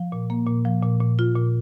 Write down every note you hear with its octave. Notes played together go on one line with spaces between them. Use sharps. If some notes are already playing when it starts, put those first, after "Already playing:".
Already playing: F3
A#2
A#3
A#2
F3
A#2
A#2
F4
A#2